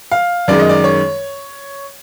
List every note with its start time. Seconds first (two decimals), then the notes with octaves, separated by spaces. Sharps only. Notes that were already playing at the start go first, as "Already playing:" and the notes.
0.11 F5
0.48 F#2 D#3 G#3 D5
0.59 D#5
0.69 D5
0.84 C#5